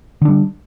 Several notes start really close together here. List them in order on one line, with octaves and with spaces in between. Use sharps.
D3 D4 G3